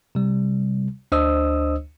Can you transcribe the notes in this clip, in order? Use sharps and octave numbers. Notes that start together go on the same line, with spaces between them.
C3 G3
D2 D4 C5 D#5 D#6 E6